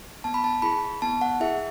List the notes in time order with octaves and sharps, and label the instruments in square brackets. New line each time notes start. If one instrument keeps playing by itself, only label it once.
[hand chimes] B3 A5
B5
A5
E4 G#4 B5
B3 A5
F#5
E4 G#4 E5